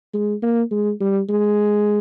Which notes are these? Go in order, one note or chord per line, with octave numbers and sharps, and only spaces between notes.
G#3
A#3
G#3
G3
G#3